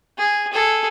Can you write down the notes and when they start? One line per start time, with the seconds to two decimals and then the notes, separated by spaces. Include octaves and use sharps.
0.18 G#4
0.53 G#4 A4